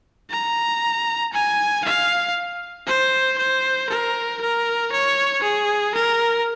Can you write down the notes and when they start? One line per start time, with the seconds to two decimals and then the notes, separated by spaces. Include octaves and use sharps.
0.30 A#5
1.33 G#5
1.84 F5
2.87 C5
3.38 C5
3.89 A#4
4.41 A#4
4.92 C#5
5.43 G#4
5.95 A#4